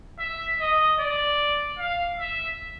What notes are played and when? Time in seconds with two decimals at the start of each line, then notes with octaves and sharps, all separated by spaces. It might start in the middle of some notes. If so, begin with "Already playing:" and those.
0.19 E5
0.59 D#5
1.00 D5
1.79 F5
2.19 E5